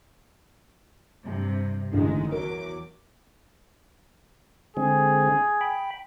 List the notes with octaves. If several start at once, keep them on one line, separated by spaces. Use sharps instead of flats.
G2 C3
A1 D3 D#3 G#3
E2 F#3 A#4 D6
D3 G#3 C4 G#4
G5 B5